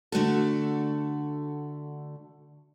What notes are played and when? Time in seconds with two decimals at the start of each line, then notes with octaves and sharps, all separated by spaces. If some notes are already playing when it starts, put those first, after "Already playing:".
0.12 D3 A3 F#4 A4